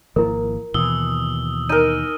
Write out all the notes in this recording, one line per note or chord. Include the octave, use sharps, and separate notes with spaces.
G#1 F3 A#3 E4 A#4
D#2 B2 E3 D#6 E6 G7
D#4 A#4 D#7